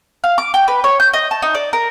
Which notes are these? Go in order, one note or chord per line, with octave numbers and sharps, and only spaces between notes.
F5
D6
G5
B4
C#5
G6
D#5
A5
D#4
D5
A#4